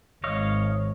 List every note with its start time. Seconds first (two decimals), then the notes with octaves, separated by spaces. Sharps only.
0.24 G#1 C#5 D#5 F5